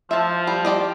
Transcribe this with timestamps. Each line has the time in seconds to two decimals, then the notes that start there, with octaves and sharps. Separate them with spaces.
0.11 F3 E5 A5
0.47 G3
0.65 G4 D5 D#5